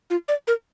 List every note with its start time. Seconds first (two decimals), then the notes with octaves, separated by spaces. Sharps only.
0.10 F4
0.28 D5
0.47 A#4